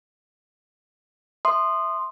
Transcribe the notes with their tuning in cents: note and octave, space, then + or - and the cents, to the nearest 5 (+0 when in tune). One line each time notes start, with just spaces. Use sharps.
E5 +0 C6 +0 D#6 -20